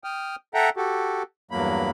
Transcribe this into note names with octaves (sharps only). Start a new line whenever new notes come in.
G5 D#6 F6
A4 E5 F#5 G5 A#5
F#4 G4 A4
E2 G2 F#3 A#3 B5